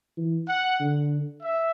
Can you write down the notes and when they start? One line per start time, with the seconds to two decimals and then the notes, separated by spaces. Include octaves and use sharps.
0.17 E3
0.48 F#5
0.80 D3
1.42 E5